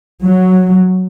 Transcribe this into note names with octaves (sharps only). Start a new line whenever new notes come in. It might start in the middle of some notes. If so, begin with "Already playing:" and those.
F#3